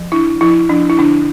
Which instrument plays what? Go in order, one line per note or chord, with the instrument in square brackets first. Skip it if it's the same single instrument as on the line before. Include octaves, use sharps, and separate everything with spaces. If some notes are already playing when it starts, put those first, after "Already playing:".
Already playing: [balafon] F3
D4 E4
F3 E4
F3 D4
E4
D3 D4